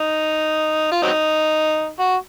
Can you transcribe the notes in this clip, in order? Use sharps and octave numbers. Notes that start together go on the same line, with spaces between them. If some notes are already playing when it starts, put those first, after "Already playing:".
Already playing: D#4
F4
F#3 C4 D#4
F#4